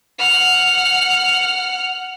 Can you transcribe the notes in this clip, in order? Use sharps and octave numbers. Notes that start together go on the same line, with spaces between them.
F#5 F6